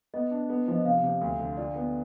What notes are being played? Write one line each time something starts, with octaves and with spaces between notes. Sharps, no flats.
B3 D#5
D4
B3
F3
D#5
C3 F5
C3
D2
D3
F4 D5
B3